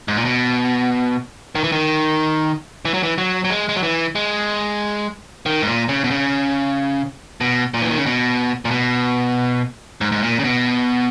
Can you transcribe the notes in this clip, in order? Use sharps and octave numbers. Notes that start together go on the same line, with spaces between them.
G#2
A#2
B2
D#3
E3
D#3
E3
F#3
E3
F#3
F#3
G#3
G#3
F#3
E3
G#3
D#3
G#2
A#2
C#3
B2
C#3
B2
A#2
E3
D#3
C#3
B2
A#2
B2
G#2
G#2
A#2
C#3
B2